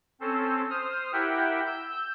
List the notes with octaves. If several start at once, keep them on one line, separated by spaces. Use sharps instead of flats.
C4 C#4 A4 C5
C5 D#6 F6
E4 G4 A#4 E5 F#5 G5
E6 G6